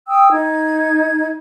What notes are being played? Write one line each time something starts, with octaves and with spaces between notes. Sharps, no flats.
G5 D#6 E6
D#4 G#6